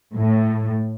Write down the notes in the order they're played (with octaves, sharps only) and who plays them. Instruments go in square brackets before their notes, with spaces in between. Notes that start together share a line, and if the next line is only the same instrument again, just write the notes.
[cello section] A2